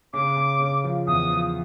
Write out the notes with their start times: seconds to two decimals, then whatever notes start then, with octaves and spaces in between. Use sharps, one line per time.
0.13 C#3 D6
0.36 C#3
0.60 C#3
0.84 F3
1.07 E2 D#6
1.30 F3